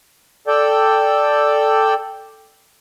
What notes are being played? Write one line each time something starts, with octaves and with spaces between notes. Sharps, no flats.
A4 D5 G5